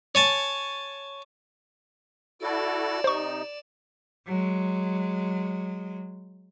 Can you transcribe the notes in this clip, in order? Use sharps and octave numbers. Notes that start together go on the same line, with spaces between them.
C#5 G#5 A5
E4 F#4 A4 D5 E7
C3 D#4 C5 C#6
F#3 G#3